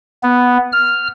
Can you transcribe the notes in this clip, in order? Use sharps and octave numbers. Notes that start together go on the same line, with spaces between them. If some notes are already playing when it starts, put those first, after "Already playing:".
B3
F6